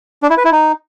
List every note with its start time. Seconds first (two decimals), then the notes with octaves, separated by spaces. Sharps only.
0.23 D4
0.30 E4
0.37 B4
0.45 E4
0.52 D#4